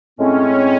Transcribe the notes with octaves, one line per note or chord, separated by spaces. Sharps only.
A2 G#3 C4 C#4